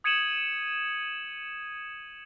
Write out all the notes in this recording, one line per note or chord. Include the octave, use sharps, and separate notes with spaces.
D#6 G#6 C#7 D#7 E7 F#7